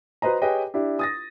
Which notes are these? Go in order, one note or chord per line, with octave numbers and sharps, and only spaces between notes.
F#4 B4 C5 D#5 A#5
G4 G#4 B4 C#5 D#5 G5
D4 E4 G4
D#6 A6 A#6